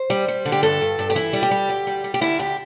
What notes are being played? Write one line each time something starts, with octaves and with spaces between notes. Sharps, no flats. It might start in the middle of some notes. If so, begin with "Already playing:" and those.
Already playing: C5
G3
G3
D3
G4
G2 A4
G2
G2
G4
E3 E4
G3
G4
G3
D2
G3
G3
G4
D3 E4
D2 G4